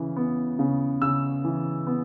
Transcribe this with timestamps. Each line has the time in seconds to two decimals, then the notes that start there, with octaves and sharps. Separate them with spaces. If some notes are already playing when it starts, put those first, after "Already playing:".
Already playing: C#3 E3
0.16 B3
0.59 C#3
1.02 C#3 E6
1.45 E3
1.87 B3